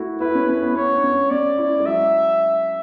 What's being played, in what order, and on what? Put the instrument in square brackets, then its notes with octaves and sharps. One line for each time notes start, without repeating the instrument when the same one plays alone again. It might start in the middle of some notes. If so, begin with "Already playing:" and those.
Already playing: [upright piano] A3 E4 F#4
[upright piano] E4 [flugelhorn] B4
[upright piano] C#4
C#4
B3
[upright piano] B3 [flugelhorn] C#5
[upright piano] D4
C#4
[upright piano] C#4 [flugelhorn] D5
[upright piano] E4
G#3
[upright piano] F#3 [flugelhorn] E5